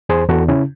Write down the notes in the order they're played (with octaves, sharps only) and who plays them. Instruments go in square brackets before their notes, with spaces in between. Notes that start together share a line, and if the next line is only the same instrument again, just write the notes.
[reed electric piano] E2 G#4 C5
E2 F#4 A4
C#3 C#4 E4